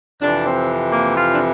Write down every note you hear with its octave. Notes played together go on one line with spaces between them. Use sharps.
F2 C3 E3 D4
C4
A#3
F4
D4